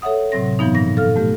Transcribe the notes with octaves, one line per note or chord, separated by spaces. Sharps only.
A4 C#5 E5 F#5 D#6
A2 C3 F#3 C4 A#6
G2 E3 F3 B3 D#4
A#2 A#6
A4 F5 F6
A3 G4